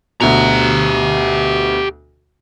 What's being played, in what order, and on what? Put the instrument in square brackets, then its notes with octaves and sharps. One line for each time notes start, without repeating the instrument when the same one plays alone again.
[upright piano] D2 B2 [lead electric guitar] G4 A#5